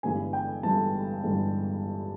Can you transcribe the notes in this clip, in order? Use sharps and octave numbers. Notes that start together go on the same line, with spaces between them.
G1 G2 E3 G#3 G#5
G5
G1 G2 E3 G#3 A5
G1 G2 E3 G#3